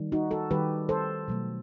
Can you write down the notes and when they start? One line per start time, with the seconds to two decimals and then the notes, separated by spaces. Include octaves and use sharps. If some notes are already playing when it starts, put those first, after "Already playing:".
Already playing: D#3 G3
0.12 D#4 F#4
0.31 F#4 A4
0.51 D#3 G3 G4 B4
0.89 A4 C5
1.28 B2 F#3 A3